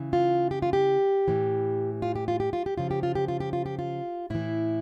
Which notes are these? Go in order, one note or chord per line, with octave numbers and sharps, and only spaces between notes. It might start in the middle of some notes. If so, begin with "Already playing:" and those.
Already playing: C#3 E3
F4
G4
F4
G4
A2 E3
F4
G4
F4
G4
F4
G4
C#3 F3 F4
G4
F4
G4
F4
G4
F4
G4
F4
A2 E3 E4